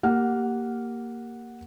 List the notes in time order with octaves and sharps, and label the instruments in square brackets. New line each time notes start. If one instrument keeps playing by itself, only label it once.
[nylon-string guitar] A#3 [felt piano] G4 F#5 F6